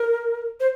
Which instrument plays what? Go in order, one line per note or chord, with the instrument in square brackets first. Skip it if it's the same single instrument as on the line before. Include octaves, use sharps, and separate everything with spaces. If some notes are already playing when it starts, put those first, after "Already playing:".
Already playing: [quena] A#4
C5